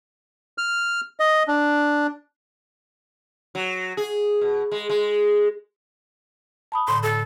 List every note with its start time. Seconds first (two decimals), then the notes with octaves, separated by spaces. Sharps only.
0.58 F6
1.20 D#5
1.48 D4
3.55 F#3
3.97 G#4
4.41 B2
4.72 G#3
4.89 G#3
6.72 A5 B5 D#6
6.88 A2 D3 C6
7.03 A4